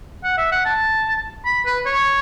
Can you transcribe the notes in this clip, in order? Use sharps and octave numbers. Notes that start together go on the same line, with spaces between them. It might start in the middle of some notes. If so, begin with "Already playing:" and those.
F#5
E5
F#5
A5
B5
B4
C#5